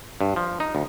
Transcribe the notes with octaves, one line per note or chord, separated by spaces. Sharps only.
G2
F3
D#4
D2